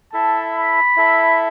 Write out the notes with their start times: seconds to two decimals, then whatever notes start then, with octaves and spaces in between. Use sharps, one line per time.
0.13 E4 A4 E5 A5
0.56 B5
0.97 E4 A4 E5